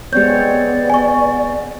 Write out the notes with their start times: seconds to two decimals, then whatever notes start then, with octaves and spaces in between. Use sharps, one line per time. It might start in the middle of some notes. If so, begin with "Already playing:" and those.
0.13 G#3 B3 C4 G4 C#5 D5 G6
0.90 G#5 C#6